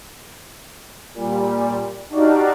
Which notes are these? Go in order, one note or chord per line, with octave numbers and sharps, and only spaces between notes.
A#2 G3
D4 D#4 F#4 G4 D5 F5